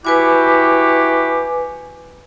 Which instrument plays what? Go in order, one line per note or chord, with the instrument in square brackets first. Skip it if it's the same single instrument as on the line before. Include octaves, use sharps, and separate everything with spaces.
[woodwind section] E4 F#4 G4 [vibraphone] B4 G#5 D6